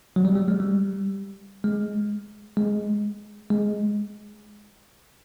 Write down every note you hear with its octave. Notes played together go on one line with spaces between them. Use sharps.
F#3
G3
G3
G#3
G3
G#3
G#3
G#3